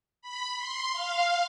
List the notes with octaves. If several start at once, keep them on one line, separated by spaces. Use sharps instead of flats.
B5
C6
F5